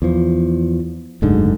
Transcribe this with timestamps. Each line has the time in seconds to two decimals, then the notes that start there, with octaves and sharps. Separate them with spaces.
0.02 E2 F3
1.22 F#1 D2 G#2 D3